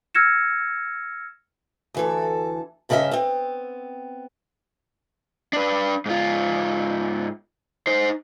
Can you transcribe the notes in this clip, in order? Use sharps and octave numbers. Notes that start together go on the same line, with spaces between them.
E6 F6 G#6 A#6 C#7 E7
D2 E3 A4
G2 C#3 C#4 G#4 D#5 E5
B3 C4
D4 B4
G#2 F4
D#4 C5